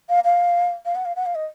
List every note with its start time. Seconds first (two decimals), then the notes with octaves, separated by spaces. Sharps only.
0.09 F5
0.25 F5
0.86 F5
0.95 F#5
1.05 F5
1.16 F#5
1.26 F5
1.35 D#5